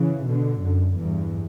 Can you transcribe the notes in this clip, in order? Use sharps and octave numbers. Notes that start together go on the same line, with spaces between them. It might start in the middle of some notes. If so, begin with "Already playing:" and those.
Already playing: C#3 E3
B2 D3
F#2
E2 G2